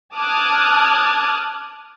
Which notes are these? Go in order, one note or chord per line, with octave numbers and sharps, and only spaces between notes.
A5 D6 D#6 F6 F#6 G#6